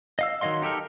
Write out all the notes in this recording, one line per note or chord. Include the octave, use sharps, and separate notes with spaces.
D#5 F5 E6
D#3 F#3 D#5 F5 C6
D#4 G4 A4 A#4